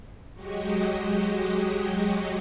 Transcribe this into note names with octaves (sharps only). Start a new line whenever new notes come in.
F#3 G#3 F#4 G4 D#5